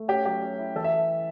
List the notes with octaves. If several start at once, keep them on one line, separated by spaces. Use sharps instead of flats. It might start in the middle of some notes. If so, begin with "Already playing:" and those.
Already playing: A3
C#4 G4
F#3 G4
C#4
E4
E3 A4
E5